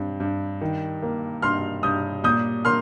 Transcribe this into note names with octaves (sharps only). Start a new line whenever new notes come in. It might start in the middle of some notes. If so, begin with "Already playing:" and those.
Already playing: G2 C4
G2
D#3
A#3
G2 C6 F6
G2 D#6 G6
A#2 D#6 G6
A#3 C6 F6